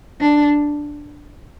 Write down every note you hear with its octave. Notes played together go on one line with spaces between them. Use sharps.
D4